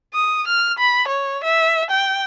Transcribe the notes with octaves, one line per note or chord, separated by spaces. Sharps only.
D#6
F6
B5
C#5
E5
G5